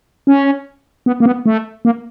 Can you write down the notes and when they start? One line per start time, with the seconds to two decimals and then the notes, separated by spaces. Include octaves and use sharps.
0.27 C#4
1.06 B3
1.20 A#3
1.26 B3
1.46 A3
1.85 A#3